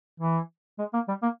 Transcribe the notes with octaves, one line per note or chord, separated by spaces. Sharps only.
E3
G#3
A#3
G3
A#3